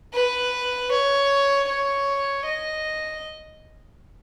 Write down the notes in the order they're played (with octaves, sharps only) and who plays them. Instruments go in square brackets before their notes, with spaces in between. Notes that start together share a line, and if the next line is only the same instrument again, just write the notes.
[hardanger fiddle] B4
C#5
C#5
D#5